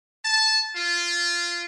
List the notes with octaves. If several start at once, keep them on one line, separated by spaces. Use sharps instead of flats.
A5
F4